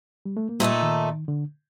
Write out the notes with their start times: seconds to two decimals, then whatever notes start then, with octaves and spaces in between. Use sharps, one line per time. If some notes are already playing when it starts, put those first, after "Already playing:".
0.25 G3
0.37 A3
0.49 A#3
0.59 A#2 G3 A3 D#4 A4
0.82 D#3
1.28 D3